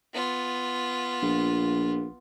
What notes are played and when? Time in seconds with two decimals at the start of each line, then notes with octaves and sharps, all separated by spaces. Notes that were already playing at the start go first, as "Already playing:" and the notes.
0.14 B3 F4
1.22 A#1